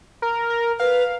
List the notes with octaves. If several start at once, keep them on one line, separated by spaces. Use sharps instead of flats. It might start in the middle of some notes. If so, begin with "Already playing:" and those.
A#4
A#4
B4 F5